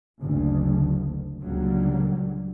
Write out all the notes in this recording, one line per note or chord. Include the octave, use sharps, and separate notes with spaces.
F#1 D2
C#2 A#2 D3 F#3 G3 A#3